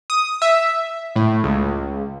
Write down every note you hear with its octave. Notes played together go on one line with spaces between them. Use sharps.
D#6
E5
A2
C#2